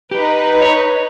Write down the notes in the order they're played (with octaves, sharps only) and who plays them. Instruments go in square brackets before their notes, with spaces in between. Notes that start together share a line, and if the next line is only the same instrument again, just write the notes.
[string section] D#4 B4 [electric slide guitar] G4
[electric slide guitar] C#5